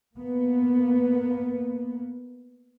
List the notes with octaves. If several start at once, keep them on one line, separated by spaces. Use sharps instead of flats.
A#3 B3